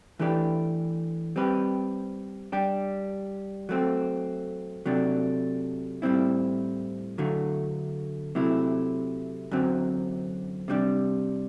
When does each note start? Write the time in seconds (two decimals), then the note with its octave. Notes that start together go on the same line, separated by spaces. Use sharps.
0.20 E3 A3 D4 G4 B4
1.36 G3 C4 G4 B4
2.52 G3 D4 G4
3.69 F#3 A3 C4
4.86 C3 F#3 A3 D4
6.02 A2 G3 C4 E4
7.18 D3 F#3 A3
8.35 C3 F#3 A3 E4
9.51 F#2 D3 F#3 C4
10.68 C3 G3 D4